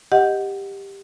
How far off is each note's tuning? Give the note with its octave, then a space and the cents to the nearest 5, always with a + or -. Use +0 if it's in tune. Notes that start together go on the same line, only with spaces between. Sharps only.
G4 +10 D#5 +0 F#5 +0